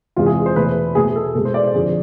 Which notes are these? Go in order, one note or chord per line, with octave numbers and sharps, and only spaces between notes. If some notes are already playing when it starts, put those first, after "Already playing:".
E2 C3 G#3 F4
G#4
C5
E2 B2 A3 B4
B2 A3 G#4
A4
B2 G#3 A4
C5
D5
C5
F2 D3 F3 G#4